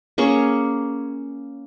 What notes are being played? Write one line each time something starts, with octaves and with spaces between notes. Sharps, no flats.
A#3 C#4 G#4 C#5